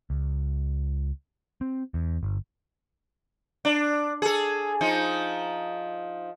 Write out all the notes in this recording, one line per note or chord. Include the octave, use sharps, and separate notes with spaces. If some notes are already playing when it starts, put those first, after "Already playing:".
C#2
C4
E2
G1
D4
G#4 A4
F3 D#4